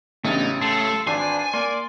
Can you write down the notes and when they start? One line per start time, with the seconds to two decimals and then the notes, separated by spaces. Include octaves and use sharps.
0.25 A1 C#3 A3 B3 D4 D#4 A6
0.61 A3 A4 C6
1.07 G#1 D4 B4 C5 G#5 C6
1.54 A#3 D5 C6